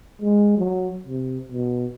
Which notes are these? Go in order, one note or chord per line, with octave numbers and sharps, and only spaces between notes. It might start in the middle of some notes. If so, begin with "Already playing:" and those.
G#3
F#3
C3
B2